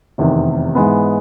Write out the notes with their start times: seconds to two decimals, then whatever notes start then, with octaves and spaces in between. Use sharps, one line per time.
0.18 F1 E2 C3 D#3
0.75 G#2 E3 G#3 B3